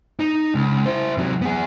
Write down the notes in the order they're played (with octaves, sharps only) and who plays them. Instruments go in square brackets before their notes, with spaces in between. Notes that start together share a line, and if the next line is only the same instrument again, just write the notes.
[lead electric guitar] D#4
C#2
E4 C5
C3 F#3
B3 G#4